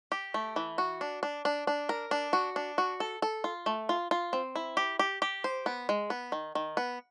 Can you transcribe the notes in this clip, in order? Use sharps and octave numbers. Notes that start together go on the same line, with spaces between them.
G4
A3
E3
F#4
D4
D4
D4
D4
A#4
D4
F#4
D4
F#4
A4
A4
F4
A3
F4
F4
C4
E4
G4
G4
G4
C5
B3
G#3
B3
D#3
D#3
B3